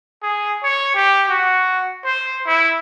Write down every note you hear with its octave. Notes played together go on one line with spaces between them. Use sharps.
G#4
C#5
G4
F#4
C5
E4